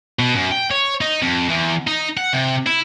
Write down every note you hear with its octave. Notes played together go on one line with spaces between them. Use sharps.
B2
F#2
G5
C#5
D#4
F2
E2
D#4
F#5
C3
E4